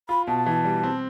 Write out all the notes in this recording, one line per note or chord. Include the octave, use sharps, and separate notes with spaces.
F4 B5
B2 A5
E3
G3
C4